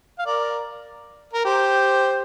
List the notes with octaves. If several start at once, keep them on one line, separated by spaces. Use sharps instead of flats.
F5
A#4 D5
A#4
G4 C5